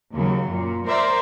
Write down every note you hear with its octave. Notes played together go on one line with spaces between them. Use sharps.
D#2 C#3 F#3
F#2 A#2
A#4 C5 D5 E5 A#5